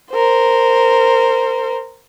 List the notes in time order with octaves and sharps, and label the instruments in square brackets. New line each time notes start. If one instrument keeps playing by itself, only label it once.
[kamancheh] A#4 C5